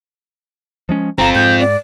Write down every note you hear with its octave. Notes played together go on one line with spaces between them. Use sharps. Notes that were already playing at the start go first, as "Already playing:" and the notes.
F3 G#3 C#4
G1 C4 F4 A#5
G#2 G6
D5